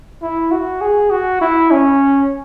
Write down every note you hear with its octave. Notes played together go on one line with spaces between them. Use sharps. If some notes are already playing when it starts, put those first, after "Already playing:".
E4
F#4
G#4
F#4
E4
C#4